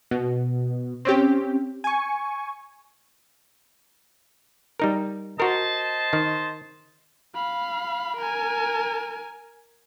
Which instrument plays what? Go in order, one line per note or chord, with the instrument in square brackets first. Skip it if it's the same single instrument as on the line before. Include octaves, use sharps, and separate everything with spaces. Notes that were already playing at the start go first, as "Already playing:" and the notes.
[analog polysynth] B2
C4 C#4 G4
G#5 C#6
[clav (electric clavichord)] G3 D#4 A#4
[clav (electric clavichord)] F#4 A#4 [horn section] C5 D#5 A5
[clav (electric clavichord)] D#3
[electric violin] F5 B5
A#4 G#5